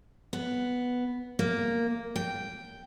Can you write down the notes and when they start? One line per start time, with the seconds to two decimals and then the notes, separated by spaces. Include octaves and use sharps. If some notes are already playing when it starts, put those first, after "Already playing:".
0.33 B3
1.39 A#3
2.16 G5